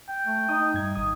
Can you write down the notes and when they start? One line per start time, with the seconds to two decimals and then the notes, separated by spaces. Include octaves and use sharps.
0.09 G5
0.26 A3
0.49 D#4 D#6
0.74 G2 G#6
0.95 G#1 D#4 D#6